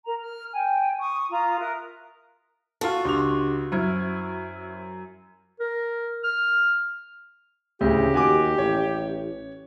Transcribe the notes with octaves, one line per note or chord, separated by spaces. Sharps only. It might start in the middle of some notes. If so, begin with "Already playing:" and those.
A#4 A#5
F6
G5 G#5
C#6 D#6
F4 A#5 D#6
A#4 E5 D#6 F#6
F4 F#4 A4
C#2 D4 G4 C6 D6 F7
F#2 E4 C5 F6 G#6
A#4
F6
D2 A2 C#3 G4
D#2 F#4 G#5 D6
A1 C#5